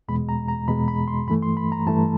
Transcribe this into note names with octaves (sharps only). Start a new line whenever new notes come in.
E2 B2 G#3 B5
A#5
A#5
E2 B2 G#3 B5
B5
C6
G2 E3 A3 B5
C6
B5
A#5
G2 E3 A3 A5